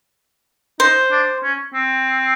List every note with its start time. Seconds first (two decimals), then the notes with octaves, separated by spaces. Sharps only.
0.80 D#4 C5
1.12 D4
1.43 C#4
1.74 C4